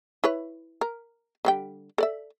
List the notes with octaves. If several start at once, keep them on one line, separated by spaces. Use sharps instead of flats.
E4 B4 C#5
A#4
D3 G3 G5
A4 D5 E5